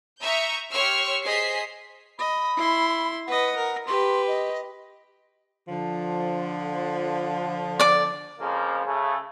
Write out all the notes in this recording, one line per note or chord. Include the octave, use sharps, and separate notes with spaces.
E5 A#5 C#6 D#6 G6
G4 C#5 C6 C#6 E6 F6
G#4 C5 D#5 B6 C7
D#5 B5
E4 C6
B4 D#5 F#5
A#4
G4 B4 C6
D#5
D3 F3
D5 D6
F2 C#3 F3 A#3
C#3 A3